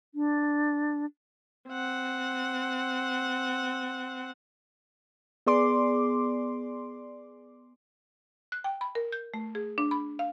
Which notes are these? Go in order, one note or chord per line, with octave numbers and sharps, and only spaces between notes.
D4
C4 F#5
B3 G#4 D5 C6 D6
F#6
G5
B5
A#4
G6
A3
G#4
D4
B5
F5